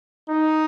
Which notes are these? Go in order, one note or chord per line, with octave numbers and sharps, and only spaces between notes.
D#4